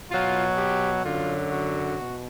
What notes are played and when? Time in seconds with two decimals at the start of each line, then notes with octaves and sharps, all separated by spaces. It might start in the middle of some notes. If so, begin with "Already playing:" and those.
0.11 B2 F#3 F4
0.57 G4
1.04 F#2 D3 F#3 F4
1.51 F#4
1.99 B2